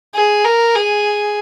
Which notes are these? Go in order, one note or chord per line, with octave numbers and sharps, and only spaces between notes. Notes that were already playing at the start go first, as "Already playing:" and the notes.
G#4
A#4
G#4